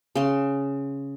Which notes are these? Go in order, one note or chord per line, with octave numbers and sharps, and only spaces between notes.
C#3 C6